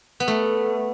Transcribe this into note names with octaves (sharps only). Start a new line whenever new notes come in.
B3
A3